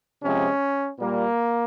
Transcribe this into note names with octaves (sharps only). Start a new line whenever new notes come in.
C3 F3 G#3 C#4
A#2 G3 A#3